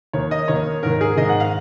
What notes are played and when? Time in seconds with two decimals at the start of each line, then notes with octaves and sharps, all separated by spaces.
0.13 D#2 D#3 C#5
0.31 D#5
0.48 D#2 D#3 C#5
0.83 G#2 D#3 A#4
1.01 G#4
1.17 G#2 D#3 D#5
1.29 F#5
1.40 F5